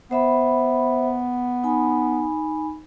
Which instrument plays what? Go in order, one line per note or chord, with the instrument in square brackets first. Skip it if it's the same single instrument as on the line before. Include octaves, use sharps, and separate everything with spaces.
[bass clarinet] B3 [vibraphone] C5 E5 B5
[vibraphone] D#4 G#5 B5